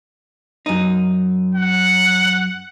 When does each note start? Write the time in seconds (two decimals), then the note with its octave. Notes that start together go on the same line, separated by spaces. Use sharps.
0.66 F#2 D#4
1.55 F#5